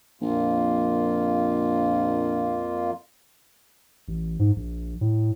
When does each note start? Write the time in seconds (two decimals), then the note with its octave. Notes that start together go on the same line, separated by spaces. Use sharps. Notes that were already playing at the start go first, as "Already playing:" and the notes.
0.21 A#1 F2 A#3 F4
4.08 A1
4.39 G#2
4.56 A#1
5.01 A2